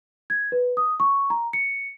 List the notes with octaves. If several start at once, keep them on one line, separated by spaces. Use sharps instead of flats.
G#6
B4
D#6
C#6
A#5
C#7